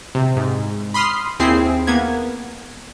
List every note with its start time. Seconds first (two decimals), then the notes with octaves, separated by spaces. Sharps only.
0.15 C3
0.37 G#2
0.94 B5 C6 D#6 F6 C7
1.39 D#2 C4 E4 G#4 C7
1.87 A#3 B3 G#6